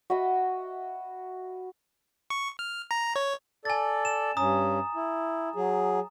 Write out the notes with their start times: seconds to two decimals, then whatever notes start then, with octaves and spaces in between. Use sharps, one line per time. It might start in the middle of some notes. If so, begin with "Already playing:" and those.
0.10 F#4 D#5 E5 B5
2.30 C#6
2.59 F6
2.91 A#5
3.16 C#5
3.65 A4 D5 G#5 A6
4.05 E7
4.37 G2 C#4 A#5 D#6
4.95 E4
5.56 F#3 G#4